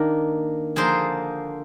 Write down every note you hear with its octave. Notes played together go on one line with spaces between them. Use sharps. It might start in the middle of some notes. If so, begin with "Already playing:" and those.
Already playing: D#3 A#3 D4
D3 F3 A#3 G#4 C5